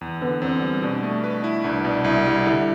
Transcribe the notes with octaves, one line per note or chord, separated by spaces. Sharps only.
E2
D3 B3
E2 C4
G3
B2 D4
A3
B4
E4
C2 D4
B2
C2 E4
G3 E4
D3 E4